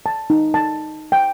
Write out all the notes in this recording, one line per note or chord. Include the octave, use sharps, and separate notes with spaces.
A5
D#4
A5
G5